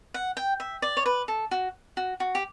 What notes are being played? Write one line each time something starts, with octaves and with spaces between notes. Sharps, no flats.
F#5
G5
E5
D5
C#5
B4
A4
F#4
F#4
F#4
G4